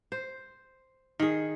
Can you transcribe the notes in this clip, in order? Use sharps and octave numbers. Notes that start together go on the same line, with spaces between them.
C5
D#3 G#4